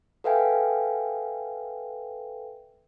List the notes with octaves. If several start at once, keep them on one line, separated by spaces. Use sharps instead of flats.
A4 B4 E5 F5 G5 G#5